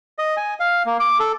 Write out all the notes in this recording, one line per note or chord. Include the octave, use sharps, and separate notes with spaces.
D#5
G#5
F5
A#3
D6
A4